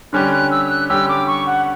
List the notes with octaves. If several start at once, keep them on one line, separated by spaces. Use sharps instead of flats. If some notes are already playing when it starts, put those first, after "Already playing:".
D3 G3 C#4 G4 F#6
F#6
E6
E6
F#6
D3 G3 C#4 G4 E6
D6
C#6
F#5